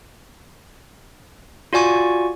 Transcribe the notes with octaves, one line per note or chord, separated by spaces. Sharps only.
F4 F#4 D5 G#5 C#6